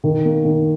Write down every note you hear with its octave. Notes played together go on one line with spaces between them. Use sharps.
D#3
A#3
D#3